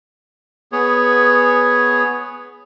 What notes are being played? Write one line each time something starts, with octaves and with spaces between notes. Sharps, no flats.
B3 G#4 C#5